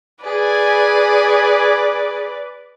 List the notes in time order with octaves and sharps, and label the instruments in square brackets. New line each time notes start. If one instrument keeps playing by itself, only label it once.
[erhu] G#4 [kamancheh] B4 D5 [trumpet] G#5